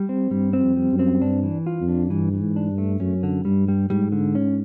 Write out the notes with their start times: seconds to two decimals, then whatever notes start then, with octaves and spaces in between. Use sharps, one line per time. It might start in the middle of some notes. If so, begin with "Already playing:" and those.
Already playing: G3
0.09 C4
0.31 G2 G3
0.53 C4
0.61 F2
0.76 G3
0.92 F#2
0.99 C4
1.21 G2 D4
1.43 E3
1.66 F4
1.81 F2
1.88 D4
2.10 G2 E3
2.33 E3
2.41 G#2
2.56 D4
2.70 G2
2.78 A3
3.00 F#2 C#4
3.23 D3
3.45 G2 G3
3.68 G3
3.90 G#2 G3
4.12 D3
4.35 C#4